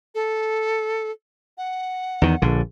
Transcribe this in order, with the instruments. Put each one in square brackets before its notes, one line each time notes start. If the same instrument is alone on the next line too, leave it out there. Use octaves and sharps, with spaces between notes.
[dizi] A4
F#5
[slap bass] E2 D#3
A#1 D3